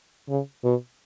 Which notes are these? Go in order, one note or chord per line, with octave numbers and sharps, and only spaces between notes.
C#3
B2